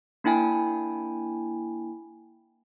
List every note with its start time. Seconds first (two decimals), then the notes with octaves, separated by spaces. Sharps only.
0.24 A#3 D4 E4 G5 G#5